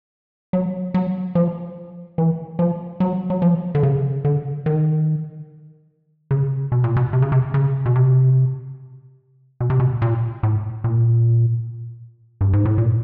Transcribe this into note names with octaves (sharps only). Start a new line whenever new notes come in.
F#3
F#3
F3
E3
F3
F#3
F#3
F3
D3
C#3
D3
D#3
C#3
B2
A#2
B2
C3
C#3
C3
C#3
B2
C3
B2
C3
B2
A#2
A2
A#2
G2
G#2
A2
A#2